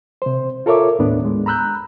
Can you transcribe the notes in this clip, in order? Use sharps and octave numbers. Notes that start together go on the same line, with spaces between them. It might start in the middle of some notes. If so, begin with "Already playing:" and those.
C3 C5
F4 A4 A#4 C#5 E5 D6
D#2 A2 B3 D4
G#3
A#5 B5 E6 F#6 G6